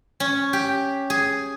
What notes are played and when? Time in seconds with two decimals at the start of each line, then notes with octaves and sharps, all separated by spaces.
0.20 C#4
0.53 G4
1.10 G#4